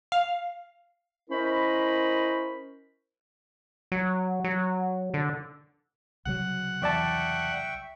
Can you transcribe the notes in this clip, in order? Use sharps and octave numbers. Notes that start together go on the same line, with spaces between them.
F5
C#4 E4 A#4 C5 D#5 B5
F#3
F#3
D3
C2 C#3 F#3 F#5
E2 D5 E5 G5 A5 C#6